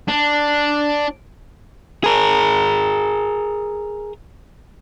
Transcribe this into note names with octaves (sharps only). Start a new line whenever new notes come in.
D4
G#4 A#4